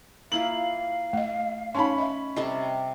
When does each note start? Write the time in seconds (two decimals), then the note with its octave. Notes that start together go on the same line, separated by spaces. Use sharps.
0.32 A#3 E4 F4 F5 F#7
1.13 A3 D#5
1.75 C#4 D#4 A5 B5 C6
1.98 D#5 E5
2.36 C3 G3 A4 D#5